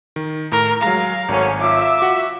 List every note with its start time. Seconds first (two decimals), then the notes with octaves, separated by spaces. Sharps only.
0.16 D#3
0.52 A2 A#4
0.82 F#3 G#3 F5 A#5
1.29 G#1 F#3 A3 C#4
1.61 F4 E5 D6
2.02 F#4 F#5